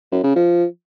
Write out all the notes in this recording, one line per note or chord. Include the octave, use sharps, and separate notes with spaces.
F#2
C#3
F3